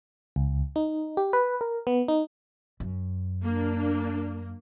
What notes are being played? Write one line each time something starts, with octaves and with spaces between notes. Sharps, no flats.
C#2
D#4
G4
B4
A#4
B3
D#4
F#2
A#3 D4